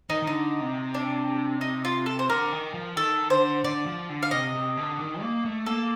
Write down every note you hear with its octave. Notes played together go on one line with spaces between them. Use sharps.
D#3 D#4
D#3
D3 D#4
C3
D4
D#4
F4
A4
C5
D3 A#4
D#3
F3
D#3 A4
D3 C5
D3 D5
F3
D3
F5
C3 D#5
C3
D3
D#3
A#3
A3
A#3 A4